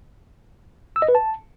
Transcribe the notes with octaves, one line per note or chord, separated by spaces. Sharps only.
E6
D#5
B4
A5